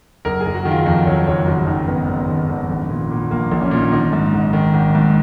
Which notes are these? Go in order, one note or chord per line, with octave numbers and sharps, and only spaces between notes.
F#1 A#4
G#4
F#1
F#4
D#3
F4
F2 F#4
F#1 C#5
F#1 C#5
G#1 F#4
D#3 D#4
G#1 B3
G#1
G#1
G#1
A#1
A#2
A#2
A#1 A#3
A#1
C#4
A#2
D#4
G#1 D#4
G#2
G#1
D#3
G#1
G#2